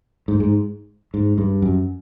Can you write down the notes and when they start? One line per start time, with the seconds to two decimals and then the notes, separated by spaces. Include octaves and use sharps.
0.28 G#2
0.40 G#2
1.14 G#2
1.38 G2
1.62 F#2